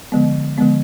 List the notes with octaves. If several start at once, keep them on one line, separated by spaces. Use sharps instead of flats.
D3 F3 G#3 B3
D3 F3 G#3 B3